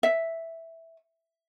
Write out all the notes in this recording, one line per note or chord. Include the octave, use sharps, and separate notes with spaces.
E5